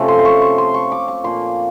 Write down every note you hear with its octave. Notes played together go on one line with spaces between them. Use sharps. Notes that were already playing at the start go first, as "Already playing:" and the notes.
Already playing: C3 F3 A3 C#4
C6
C6
C#6
C6
C6
C#6
D6
C#6
A#2 F3 A#3 C6